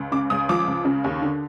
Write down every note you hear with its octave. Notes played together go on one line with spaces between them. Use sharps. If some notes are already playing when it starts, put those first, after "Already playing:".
Already playing: C#2
C#3 D6
C#2 D#6
F3 D6
C#2
C#3
D#2
D3